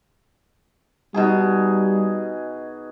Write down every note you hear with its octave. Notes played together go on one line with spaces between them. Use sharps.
B2 G3 D#4 G#4